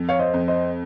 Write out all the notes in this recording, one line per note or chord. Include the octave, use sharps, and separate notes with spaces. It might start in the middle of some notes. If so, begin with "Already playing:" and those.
Already playing: F2
C#5 F5
C5 D#5
F2
C5 D#5